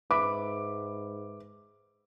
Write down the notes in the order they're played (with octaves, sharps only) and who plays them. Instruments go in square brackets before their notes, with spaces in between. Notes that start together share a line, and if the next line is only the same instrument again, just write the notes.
[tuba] G#2 [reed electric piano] B4 E5 B5 [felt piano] D6